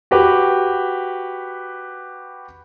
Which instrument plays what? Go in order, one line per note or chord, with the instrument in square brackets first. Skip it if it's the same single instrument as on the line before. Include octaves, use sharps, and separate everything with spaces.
[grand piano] F#4 G4 B4